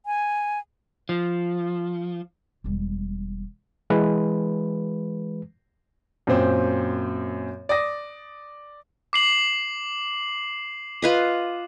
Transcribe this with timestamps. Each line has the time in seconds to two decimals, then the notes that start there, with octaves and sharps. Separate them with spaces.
0.06 G#5
1.09 F3
2.64 E1 G3
3.90 E3 G#3 B4
6.27 F#2 A#2 C4 C5
7.69 D5 D#6 A#6
9.13 D6 C7 F#7
11.02 F4 B4 D#5